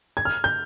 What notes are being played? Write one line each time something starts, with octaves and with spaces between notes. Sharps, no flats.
G#6
F6
G6